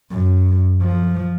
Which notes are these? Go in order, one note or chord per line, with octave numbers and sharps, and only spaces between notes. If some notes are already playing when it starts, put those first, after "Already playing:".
F#2
F3